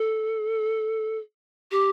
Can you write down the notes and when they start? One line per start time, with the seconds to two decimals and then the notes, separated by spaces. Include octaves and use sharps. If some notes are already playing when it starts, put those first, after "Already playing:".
Already playing: A4
1.71 G4